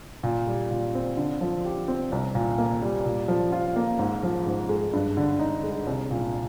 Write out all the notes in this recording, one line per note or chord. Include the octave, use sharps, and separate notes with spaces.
A#2
G3
A#2
C4
D3
F3
G4
C4
C2
A#2
A#3
G3
A#2
F3
F4
A#3
G#2
F3
G#2
G#3
G2
D3
D#4
G#3
C2
A#2